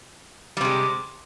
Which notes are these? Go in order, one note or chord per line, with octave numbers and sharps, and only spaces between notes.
C3 G3 G#3